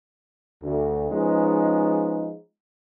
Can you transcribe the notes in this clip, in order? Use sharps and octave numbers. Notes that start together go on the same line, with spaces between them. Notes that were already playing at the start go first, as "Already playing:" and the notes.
D2
F3 G#3 B3 C#4 D#4